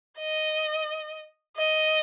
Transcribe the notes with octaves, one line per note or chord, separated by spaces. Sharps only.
D#5
D#5